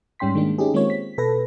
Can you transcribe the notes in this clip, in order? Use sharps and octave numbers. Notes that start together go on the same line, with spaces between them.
G#2 G3 C#4 G5 C6 B6
D#3 G#3 A#3 D4
C#4 D#4 G4 G#4
D#3 G#3 A#3 C4 F4 C#5
B6
B2 A4 B4 A#6